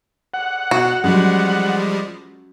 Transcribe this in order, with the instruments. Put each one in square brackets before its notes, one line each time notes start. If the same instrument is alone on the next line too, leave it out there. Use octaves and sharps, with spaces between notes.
[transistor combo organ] F#5
[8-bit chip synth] B2 [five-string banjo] F#4
[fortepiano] F#2 [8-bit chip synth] F3 G3 G#3